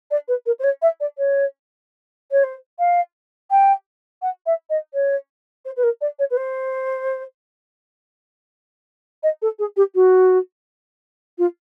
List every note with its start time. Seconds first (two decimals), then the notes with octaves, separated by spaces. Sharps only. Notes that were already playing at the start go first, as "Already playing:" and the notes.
0.11 D5
0.28 B4
0.46 A#4
0.59 C5
0.64 C#5
0.82 E5
1.00 D5
1.18 C#5
2.31 C#5
2.44 C5
2.79 F5
3.51 G5
4.22 F#5
4.46 E5
4.70 D#5
4.94 C#5
5.65 C5
5.77 B4
5.83 A#4
6.01 D5
6.19 C#5
6.31 B4
6.37 C5
9.23 D#5
9.42 A4
9.59 G#4
9.77 G4
9.95 F#4
11.38 F4